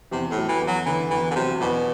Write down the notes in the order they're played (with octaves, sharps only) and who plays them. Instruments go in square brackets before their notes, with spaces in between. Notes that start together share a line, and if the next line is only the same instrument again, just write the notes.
[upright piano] E2 [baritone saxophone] C3
[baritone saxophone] A2
[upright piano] F#3
[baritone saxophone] E3
[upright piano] E2
[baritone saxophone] F#3
[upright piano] D3 [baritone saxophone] E3
[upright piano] E2 [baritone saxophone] E3
[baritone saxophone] D3
[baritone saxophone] C3 [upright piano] F#3
[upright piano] E2 [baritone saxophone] B2